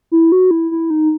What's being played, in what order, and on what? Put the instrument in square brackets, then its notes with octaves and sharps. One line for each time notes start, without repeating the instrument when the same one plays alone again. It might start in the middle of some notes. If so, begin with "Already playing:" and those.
[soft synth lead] E4
F#4
E4
E4
D#4